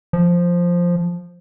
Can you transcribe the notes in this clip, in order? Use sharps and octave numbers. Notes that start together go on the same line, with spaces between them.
F3